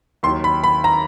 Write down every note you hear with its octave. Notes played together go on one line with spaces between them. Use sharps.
D#2 D#3 F#3 C6
B5
B5
A#5